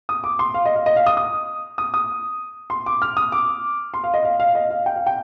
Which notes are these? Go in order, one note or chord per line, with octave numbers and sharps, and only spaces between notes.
D#6
D6
C6
F5
D#5
F5
D#5
F5
D#6
D#6
D#6
D#6
C6
D6
F6
D#6
D6
C6
F5
D#5
F5
F5
D#5
F5
G5
F5
G5